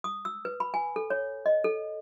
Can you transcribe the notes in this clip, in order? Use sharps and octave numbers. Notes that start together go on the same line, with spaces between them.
D#6
E6
B4
B5
G#5
A4
C#5
D#5
A4